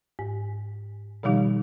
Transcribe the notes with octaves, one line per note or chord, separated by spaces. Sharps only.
G#2
B2 D#3 F3 G3 D#4 G4